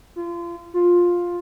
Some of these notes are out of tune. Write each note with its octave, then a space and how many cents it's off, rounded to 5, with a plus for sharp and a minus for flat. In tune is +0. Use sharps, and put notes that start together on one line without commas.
F4 -30
F4 +10